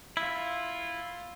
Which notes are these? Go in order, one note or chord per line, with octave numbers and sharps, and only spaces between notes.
E4 F4 C6